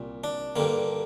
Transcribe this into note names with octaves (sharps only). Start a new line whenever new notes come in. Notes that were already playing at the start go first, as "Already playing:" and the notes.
Already playing: C2 A#2
D4
G2 D3 A#3